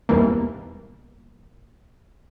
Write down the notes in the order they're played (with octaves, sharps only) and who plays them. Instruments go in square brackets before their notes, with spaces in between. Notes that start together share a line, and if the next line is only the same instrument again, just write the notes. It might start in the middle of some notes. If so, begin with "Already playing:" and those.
[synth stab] E2 G#2 B2 E3 G3 A#3